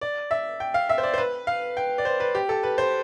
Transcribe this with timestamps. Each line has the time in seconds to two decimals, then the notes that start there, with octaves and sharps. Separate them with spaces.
0.01 D5
0.31 E5
0.60 G5
0.74 F5
0.89 E5
0.98 C5
1.03 D5
1.14 C5
1.18 B4
1.47 F5
1.77 G5
1.98 D5
2.05 C5
2.20 B4
2.35 G4
2.49 A4
2.63 B4
2.78 C5